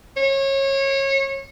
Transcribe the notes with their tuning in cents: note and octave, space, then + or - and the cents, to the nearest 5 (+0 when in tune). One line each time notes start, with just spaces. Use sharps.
C#5 -25